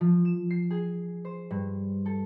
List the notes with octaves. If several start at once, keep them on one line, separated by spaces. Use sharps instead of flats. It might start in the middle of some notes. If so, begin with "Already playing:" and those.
F3
E7
C7
G#4
C5
G2
A4